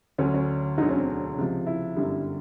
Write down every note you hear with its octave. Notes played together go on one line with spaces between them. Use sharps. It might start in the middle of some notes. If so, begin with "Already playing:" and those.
D2 D3 F#3 C#4
C#4
E1 D2 D3 F#3 D#4
C#4
C4
C#2 C3 F3
E4
G1 F#2 D3 G3